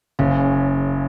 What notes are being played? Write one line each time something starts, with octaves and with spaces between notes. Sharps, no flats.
F#1 C#3